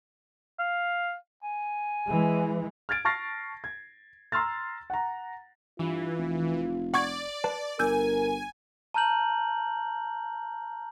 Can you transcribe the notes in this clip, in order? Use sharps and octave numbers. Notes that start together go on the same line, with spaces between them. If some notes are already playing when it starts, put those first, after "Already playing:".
F5
G#5
E3 G#3
F6 G#6 A6 D7
A5 C#6 F6 A6 A#6 C7
G#6
A#5 C6 E6 F6 A6
F#5 A#5
G2 E3 F4
F1
D5 F#5 C#6 G#6
B4 A5
G1 A#4 G#5 E6 G6
A5 A#5 F6 G6 F#7